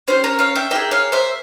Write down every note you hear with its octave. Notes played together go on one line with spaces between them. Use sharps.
C#4 E4 G4 C5
A#4 C#5
C#5 F5
E5 G5
A#3 E4 G#4 E5 G5
C#5 F5
C5 E5